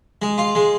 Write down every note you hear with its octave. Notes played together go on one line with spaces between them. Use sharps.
G#3
F4
G#3